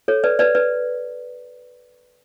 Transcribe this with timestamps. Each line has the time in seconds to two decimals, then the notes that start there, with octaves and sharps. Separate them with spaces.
0.08 A4 C#5
0.24 B4 D5
0.39 B4 D5
0.55 B4 D5